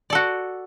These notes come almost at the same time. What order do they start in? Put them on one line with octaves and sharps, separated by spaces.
D5 A4 F#4